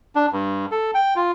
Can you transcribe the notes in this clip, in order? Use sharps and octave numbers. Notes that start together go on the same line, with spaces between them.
D4
G2
A4
G5
F4